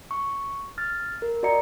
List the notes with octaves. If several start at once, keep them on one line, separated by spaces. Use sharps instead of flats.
C#6
F6 A6
A#4
F#4 D5 D#5 A#5 C#7